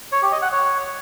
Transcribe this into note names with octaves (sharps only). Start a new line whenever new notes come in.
C#5
G4
D#5
F#5
C#5